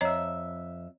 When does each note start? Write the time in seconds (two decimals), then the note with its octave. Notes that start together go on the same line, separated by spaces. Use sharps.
0.01 F2 C#5 D#5 E5 A#5